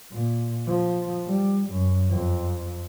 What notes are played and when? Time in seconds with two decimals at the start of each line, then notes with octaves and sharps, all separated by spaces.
0.12 A#2
0.67 F3
1.26 G3
1.71 F#2
2.10 F2